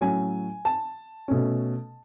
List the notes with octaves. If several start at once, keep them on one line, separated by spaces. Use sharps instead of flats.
A2 F#3 C#4 G#5
A5
B2 A3 C#4